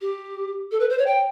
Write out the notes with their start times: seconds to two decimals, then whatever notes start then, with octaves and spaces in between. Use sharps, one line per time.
0.01 G4
0.71 A4
0.79 B4
0.89 C5
0.98 C#5
1.06 G5